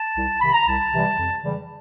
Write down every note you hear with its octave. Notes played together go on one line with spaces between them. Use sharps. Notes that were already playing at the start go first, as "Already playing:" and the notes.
Already playing: A5
C2
C3 D#3 B5
A#5
C2 A5
C3 E3 G3
F2
C#3 E3 G3